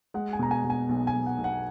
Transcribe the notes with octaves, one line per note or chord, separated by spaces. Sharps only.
G#3 F#5
G#5
B2 A#5
G#5
B2
G#5
B1
G#5
B1
F#5
B1
F#5